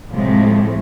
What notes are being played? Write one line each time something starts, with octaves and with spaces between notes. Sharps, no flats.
A2 C3 F3 G#3 A3